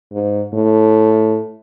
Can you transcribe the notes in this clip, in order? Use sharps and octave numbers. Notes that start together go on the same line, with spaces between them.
G#2
A2